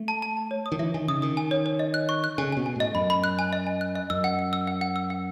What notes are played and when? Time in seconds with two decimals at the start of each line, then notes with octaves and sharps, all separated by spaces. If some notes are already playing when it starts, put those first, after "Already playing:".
Already playing: A3
0.08 A5
0.22 A5
0.37 A5
0.51 C#5
0.66 D#6
0.72 D#3
0.79 E3 E5
0.94 D#3 G#5
1.08 C#3 D#6
1.22 D#3 D#6
1.37 G#5
1.51 C#5
1.66 C#5
1.79 D#5
1.94 F#6
2.09 C#6
2.24 F#6
2.38 C#3 G#5
2.52 B2 G#5
2.66 G#5
2.76 A2 D#5
2.95 F#2 B5
3.10 B5
3.24 F#6
3.39 G#5
3.53 D#5
3.67 G#5
3.81 F#6
3.95 D#5
4.10 F#2 E6
4.24 F#5
4.39 F#5
4.53 E6
4.67 F#5
4.81 F#5
4.96 E6
5.10 F#5